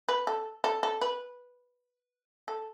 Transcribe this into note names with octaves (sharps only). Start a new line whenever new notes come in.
B4
A4
A4
A4
B4
A4